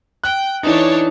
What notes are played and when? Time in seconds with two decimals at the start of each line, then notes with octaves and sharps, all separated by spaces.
0.24 G5 F#6
0.63 E3 D4 D#4 A4 C#5